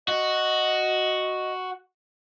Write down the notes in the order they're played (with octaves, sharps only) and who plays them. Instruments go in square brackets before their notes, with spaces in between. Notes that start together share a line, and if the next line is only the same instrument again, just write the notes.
[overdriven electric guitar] F#4 [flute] D#5